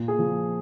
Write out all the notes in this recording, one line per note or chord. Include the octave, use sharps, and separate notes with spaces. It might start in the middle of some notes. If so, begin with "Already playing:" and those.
Already playing: A#2
G#4
F3